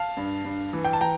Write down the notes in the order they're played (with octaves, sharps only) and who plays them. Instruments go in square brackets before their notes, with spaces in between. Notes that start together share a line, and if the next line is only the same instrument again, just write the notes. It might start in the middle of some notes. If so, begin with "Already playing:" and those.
Already playing: [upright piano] F5 A5
G2
G2
E3
G5
A5
E3 G5 A#5